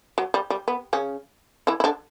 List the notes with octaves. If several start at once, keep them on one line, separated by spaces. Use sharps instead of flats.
F#3
G3
G3
B3
C#3 C#4
E3 E4
E4
D3 D4